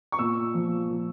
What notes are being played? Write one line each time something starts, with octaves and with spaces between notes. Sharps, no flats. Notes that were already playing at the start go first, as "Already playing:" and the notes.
C#6
A#2 E6
F3
A#2